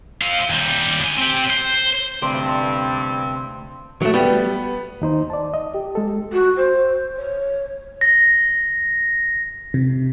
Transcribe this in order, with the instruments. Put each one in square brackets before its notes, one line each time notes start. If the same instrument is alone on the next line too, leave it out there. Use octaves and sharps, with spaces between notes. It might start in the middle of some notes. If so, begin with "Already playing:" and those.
[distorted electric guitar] C4 F5
D#2 G3
D2 G#5
C4 G4
C5
[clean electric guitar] D2 C3 D5 [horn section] G2 [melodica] C4 [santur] C5
[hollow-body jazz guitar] F#3 A3
[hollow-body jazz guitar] G3 [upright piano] B3
[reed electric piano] D#2 D#4 C5
D5 A5
D#5
G4
G#3 A4
[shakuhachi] F#4
C5
C#5
[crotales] A#6
[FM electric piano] C3